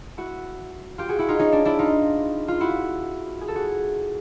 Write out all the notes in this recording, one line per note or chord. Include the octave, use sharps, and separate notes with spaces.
E4 F#4
F4 G4
F#4 G#4
E4 F#4
D#4 F4
C#4 D#4
D4
D4 E4
D#4 F4
F4
E4 F#4
G#4
A4
F#4 G#4